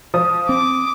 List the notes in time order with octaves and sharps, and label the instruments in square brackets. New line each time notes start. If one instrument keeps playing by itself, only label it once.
[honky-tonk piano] F3 [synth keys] D#6
[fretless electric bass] C4 [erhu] D6